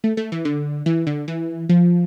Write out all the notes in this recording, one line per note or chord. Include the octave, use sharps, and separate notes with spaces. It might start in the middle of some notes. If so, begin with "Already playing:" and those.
A3
A3
E3
D3
E3
D3
E3
F3